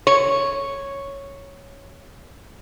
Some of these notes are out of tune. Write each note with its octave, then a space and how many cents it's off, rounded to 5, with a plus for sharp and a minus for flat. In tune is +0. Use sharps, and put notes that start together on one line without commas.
C#5 +0